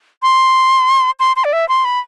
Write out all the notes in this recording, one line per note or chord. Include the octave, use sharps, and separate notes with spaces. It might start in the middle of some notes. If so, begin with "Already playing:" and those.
C6
C6
C6
D5
E5
C6
B5